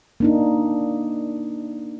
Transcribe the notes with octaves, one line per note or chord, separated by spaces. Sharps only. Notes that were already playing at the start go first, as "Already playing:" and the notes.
A#3 D4 D#4